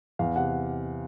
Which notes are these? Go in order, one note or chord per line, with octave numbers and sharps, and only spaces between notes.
E2 F5
C3 F#5